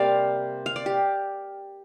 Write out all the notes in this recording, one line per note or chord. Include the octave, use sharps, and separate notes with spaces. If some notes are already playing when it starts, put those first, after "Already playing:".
Already playing: C3 G3 A#3 C5 D5 F5
F5
D5
G4